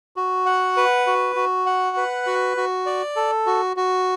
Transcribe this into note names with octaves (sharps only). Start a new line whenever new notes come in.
F#4
F#5
B4
F#4
F#4
F#5
B4
F#4
F#4
D5
A4
F#4
F#4